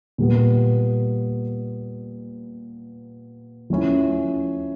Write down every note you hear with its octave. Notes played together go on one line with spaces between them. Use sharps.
A#2 G3 B3
F3 A3 C#4 E4